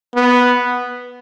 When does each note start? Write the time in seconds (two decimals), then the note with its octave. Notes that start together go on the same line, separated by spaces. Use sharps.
0.15 B3